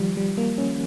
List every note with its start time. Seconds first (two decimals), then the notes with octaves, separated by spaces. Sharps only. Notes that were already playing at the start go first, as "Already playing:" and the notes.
Already playing: D#3 F3 G3
0.17 G3
0.37 A#3
0.58 C#4